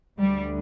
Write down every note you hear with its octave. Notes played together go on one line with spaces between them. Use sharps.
D2 D3 G3